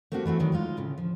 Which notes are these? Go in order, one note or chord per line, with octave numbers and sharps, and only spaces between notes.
A3 A#3 C4 D4 F#4 G4
E3 A3 C4 F#4
D#3 E3 F#3 D4
G#3 D#4 F4
D2 A2 C#3
F3